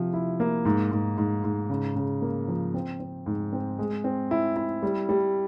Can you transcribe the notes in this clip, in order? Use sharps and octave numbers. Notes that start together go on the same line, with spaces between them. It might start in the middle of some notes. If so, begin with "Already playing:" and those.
Already playing: C3 F3
E4
A#3
G#2
G#2
G#2
G#2
C#3
C#3
A#3
F3
C4
C4
G#2
C4
G#3
C4
E4
E4
G3
G3